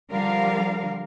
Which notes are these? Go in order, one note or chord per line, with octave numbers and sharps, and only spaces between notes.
D3 F3 G3 A#4 F5